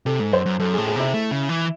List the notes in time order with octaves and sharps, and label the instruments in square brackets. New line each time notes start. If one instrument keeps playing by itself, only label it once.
[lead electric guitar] C3 [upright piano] A4
[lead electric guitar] G#2
[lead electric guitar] F#2 [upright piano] C5
[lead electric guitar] F#2
[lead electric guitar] F#2 [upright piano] A4
[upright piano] G#4
[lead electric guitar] A2
[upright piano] G#4
[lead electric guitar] C3 [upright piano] E4
[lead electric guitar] A3
C#3
E3